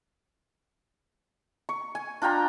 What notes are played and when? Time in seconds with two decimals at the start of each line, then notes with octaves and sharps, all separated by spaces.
1.69 C#6
1.95 G#5
2.22 D4 F4 G5 A#5